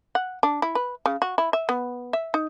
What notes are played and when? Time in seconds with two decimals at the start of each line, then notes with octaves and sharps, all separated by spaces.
0.15 F#5
0.43 D4
0.62 E4
0.75 B4
1.06 C#3
1.22 F#4
1.38 E4
1.53 E5
1.69 B3
2.13 E5
2.34 D#4